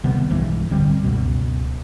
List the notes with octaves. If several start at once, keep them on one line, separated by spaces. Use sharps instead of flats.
C3 D#3 G3 B3
B1 G2 E3 G#3
D1 D3 G3 C4
C#2 F#2 B2